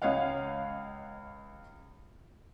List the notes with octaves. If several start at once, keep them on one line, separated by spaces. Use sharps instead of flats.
C#2 C#5 D#5 F5 F#5